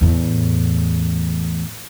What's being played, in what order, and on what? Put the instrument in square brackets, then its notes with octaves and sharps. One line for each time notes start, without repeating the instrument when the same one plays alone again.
[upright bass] E2 A2